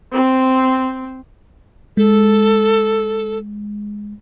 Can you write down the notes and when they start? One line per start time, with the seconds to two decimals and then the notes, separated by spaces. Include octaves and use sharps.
0.13 C4
1.97 G#3 A4